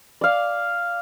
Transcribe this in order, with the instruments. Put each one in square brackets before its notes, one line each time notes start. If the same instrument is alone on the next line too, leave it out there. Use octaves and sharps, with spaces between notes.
[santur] D5 F5